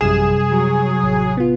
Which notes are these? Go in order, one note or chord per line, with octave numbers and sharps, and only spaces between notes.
A1 F#2 C3 G3 G#4 E7
F#3
A1
B3 F4